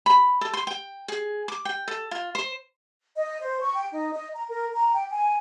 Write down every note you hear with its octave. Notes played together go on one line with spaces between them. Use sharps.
B5
A4
C6
G5
G#4
D6
G5
A4
F4
C5
D#5
C5
C#6
G5
D#4
D#5
A#5
A#4
A#5
G5
G#5